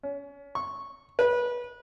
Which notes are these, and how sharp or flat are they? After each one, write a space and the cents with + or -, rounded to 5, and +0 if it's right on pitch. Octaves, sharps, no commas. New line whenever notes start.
C#4 +30
C#6 -10
B4 -25